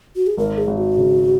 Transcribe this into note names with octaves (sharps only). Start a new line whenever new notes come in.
F#4
G#4
G#1 A#4
G#4
G#1
F#4
C#3